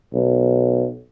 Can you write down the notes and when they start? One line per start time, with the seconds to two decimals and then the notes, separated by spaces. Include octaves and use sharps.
0.13 B1